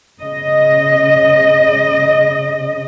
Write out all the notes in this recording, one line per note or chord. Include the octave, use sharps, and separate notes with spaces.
C#3 D#5